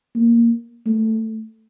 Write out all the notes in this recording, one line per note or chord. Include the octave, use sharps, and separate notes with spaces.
A#3
A3